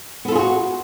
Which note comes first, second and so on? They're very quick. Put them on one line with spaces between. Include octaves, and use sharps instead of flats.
B3 A4 F4 G#4 F#4